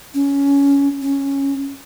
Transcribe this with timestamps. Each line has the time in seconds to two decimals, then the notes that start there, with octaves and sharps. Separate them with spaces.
0.14 C#4
1.02 C#4